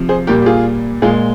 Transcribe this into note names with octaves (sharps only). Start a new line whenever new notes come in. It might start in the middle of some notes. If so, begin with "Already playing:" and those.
Already playing: C3 F3
G#4 C5
A#2 G3 A#3 G4 A#4
G4
F4 G#4
A#2 G#3 F4 G#4